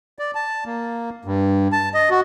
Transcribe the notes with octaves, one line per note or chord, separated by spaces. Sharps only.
D5
A5
A#3
G2
A5
D#5
F#4